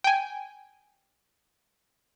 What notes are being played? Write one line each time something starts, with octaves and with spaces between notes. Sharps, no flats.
G5 G#5